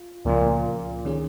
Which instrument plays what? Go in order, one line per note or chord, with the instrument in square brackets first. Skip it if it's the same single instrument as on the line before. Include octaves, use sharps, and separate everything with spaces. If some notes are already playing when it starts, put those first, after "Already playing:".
Already playing: [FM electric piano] F4
[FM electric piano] C#2 C#3 F3 A#3 [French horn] A#2
[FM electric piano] D#3 C#4 G#4